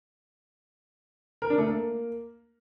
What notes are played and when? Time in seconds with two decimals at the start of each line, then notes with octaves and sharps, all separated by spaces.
1.42 A#4
1.50 D4
1.58 A3
1.67 A#3